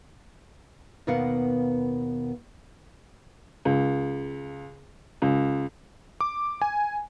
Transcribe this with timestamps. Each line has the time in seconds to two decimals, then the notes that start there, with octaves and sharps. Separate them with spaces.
1.07 D#2 B2 B3 A#4 F5 F#5
3.65 C#2
5.22 C#2
6.21 D6
6.62 G#5